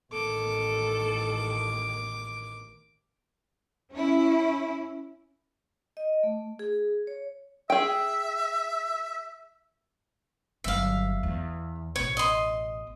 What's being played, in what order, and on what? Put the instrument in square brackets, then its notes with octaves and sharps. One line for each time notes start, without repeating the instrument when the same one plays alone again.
[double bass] A1 D#3 [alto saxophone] A4 [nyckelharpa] D6
[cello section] C#4 E4
[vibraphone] D#5
A3
G#4
C#5
[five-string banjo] G#4 G5 [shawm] E5
[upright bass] G1 F#3 [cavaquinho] E5 F5
[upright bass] E2
[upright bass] A1 B2 [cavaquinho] C#5
[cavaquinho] D#5 C6